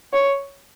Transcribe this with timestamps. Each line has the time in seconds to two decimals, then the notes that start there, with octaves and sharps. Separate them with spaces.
0.13 C#5